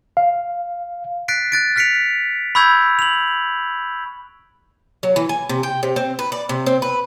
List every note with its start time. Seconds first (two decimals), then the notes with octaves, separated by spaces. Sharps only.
0.17 F5
1.28 F#6 A6 B6 C7 D7
1.52 F#6 A6 D7
1.76 F6 F#6 B6 C#7 D7 F7
2.55 B5 C#6 E6 G6 G#6 F7
2.99 F7 F#7
5.03 F#3
5.16 E3
5.29 G#5
5.49 C3
5.63 G5
5.83 C3
5.96 C4
6.19 B4
6.32 D5
6.49 C3
6.66 C4
6.82 B4